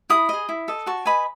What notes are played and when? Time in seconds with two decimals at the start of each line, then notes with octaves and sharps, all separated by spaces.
0.10 E4 B5 D#6
0.29 G#4 D#5
0.49 E4
0.68 A4 D#5
0.86 F#4 A5 C#6
1.05 B4 D#5 G#5 B5